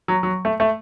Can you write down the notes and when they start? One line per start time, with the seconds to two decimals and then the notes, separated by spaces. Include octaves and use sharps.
0.08 F#3
0.23 F#3
0.45 A3
0.60 A3